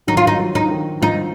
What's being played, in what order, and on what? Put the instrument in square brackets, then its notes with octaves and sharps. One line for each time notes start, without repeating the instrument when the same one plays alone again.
[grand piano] D#3 F#3 [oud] D#4
[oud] F4
D#4
[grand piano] F#3
F3
[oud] D#4
[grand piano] D#3
[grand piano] F3 [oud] D#4